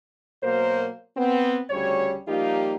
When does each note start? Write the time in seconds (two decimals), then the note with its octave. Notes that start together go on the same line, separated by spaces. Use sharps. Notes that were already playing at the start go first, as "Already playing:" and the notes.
0.43 B2 F#3 A#3 A#4 C5
1.16 B3 C4
1.70 D2 C#3 G3 C#5
2.28 F3 G3 A#3 D#4 F4 G4